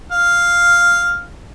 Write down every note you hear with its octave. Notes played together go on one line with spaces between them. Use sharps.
F5